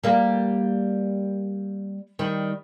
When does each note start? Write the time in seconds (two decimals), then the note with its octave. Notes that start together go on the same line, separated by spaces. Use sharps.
0.04 G3 A#3
2.19 D#3 G3